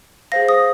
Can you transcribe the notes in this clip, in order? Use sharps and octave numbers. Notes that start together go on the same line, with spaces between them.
G#4 C5 F5 A#6
D#6